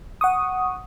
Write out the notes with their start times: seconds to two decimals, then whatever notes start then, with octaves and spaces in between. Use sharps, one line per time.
0.21 F#5 C#6 D#6